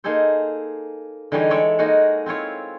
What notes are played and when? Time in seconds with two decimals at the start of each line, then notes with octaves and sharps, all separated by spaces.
0.04 A#3 D#4 G#4 A4 C5
1.32 D3 E3 G3 D#4 G#4 C#5
1.50 G#3 A4 C#5 D5 E5
1.79 G#3 A#3 D#4 F#4 G#4 F#5
2.26 C4 E4 F4 C#5